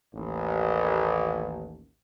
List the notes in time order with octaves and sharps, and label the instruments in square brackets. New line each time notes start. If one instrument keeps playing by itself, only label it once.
[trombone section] A1 D#2